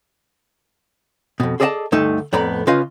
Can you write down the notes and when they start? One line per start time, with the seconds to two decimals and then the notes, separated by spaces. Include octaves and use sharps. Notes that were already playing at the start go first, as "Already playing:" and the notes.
1.40 F2 B2
1.60 G#4 A4 D5 D#5 F5 A5
1.92 D2 G2 A3 D#4 A4
2.33 F2 A2 B3 D5 A#5 B5
2.67 C#3 C#4 F4 B4 D#5 F5